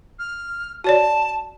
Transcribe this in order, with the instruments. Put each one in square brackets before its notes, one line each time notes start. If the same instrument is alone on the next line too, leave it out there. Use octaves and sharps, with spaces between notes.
[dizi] F6
[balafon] F#4 C#5 D5 [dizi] A5